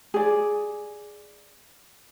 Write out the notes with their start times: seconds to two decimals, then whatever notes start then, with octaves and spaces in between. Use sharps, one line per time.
0.14 G#4 D5